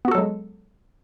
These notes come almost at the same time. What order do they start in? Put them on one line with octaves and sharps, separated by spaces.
B3 F#4 A4 F#3 G#3